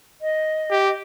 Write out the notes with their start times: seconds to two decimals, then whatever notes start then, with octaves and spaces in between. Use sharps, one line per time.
0.21 D#5
0.71 G4